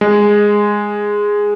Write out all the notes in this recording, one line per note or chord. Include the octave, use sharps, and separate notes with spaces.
G#3